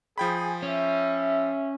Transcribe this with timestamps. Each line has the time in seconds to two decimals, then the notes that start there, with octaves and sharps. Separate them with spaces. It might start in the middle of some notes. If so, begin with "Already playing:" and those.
0.18 F3 G#4 G5 B5
0.63 C#4 E5